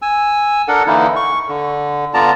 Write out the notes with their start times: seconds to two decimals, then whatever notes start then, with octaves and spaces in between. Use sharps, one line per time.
0.02 G#5 E6
0.68 D4 A4 A#4 F#5
0.87 D3 E3 A#3 D#4 E4
1.16 C#6
1.49 D3
2.14 D3 B3 F4 D5 A5 A#5